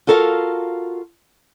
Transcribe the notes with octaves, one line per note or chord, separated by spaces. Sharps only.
F4 F#4 A4 A#4 D#5 F5